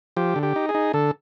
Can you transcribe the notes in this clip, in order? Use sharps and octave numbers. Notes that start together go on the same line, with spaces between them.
F3 G4
D3
G4
D#4
G#4
D#4
D3 A4